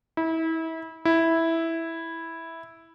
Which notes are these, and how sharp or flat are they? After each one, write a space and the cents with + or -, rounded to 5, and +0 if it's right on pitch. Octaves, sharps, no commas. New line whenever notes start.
E4 -30
E4 -5